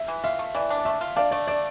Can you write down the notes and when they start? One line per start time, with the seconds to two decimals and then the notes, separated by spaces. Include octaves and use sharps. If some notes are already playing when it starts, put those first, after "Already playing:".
Already playing: E5
0.08 E3
0.24 F4 E5
0.39 A3
0.55 E3 D5
0.70 D4
0.85 A3 E5
1.01 F4
1.16 D4 D5 F5
1.31 A3 D5
1.47 D4 D5